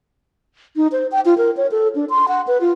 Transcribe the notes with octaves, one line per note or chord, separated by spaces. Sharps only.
D#4
C5
G5
F4
A#4
C#5
A4
D4
C6
F#5
B4
F4